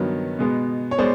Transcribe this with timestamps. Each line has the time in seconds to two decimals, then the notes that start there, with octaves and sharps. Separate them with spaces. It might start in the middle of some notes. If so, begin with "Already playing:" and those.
Already playing: G2 D#3 F#3 B3
0.39 B2 G#3 B3
0.91 C#5
0.98 G#3 B3 C5 D5